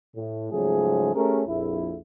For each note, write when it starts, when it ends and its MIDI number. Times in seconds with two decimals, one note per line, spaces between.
0.16 0.50 45
0.52 1.12 44
0.52 1.12 49
0.52 1.12 53
0.52 1.12 54
0.52 1.12 57
0.52 1.12 68
1.15 1.42 57
1.15 1.42 61
1.15 1.42 67
1.15 1.42 68
1.15 1.42 70
1.47 1.96 34
1.47 1.96 41
1.47 1.96 64